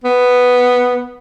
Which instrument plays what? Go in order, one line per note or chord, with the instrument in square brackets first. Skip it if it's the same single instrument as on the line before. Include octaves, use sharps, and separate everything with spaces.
[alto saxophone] B3